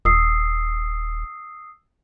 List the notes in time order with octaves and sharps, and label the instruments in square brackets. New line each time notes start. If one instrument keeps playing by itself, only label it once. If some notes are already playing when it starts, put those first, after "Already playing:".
[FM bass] D#1 [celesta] D#6 E6 C7